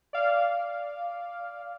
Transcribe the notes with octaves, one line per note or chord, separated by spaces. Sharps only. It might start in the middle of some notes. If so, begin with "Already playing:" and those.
D5 F5